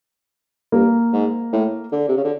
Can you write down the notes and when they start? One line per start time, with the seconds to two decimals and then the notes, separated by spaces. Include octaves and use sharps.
0.72 G2 A#3
1.13 G#2
1.52 A2
1.92 D3
2.08 C3
2.16 C#3
2.24 D3